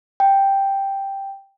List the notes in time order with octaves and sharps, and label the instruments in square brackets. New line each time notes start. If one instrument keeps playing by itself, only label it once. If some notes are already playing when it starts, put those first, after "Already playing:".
[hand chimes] G5